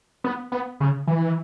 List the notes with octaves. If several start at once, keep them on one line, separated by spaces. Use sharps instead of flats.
B3
B3
C#3
E3